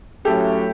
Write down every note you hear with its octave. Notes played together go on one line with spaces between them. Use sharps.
A2 F#3 A3 C#4 F#4 G4 A4